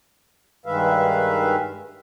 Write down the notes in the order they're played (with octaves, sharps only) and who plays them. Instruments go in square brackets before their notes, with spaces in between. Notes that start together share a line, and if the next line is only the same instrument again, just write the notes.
[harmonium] G2 D#3 G#3 B4 E5 F5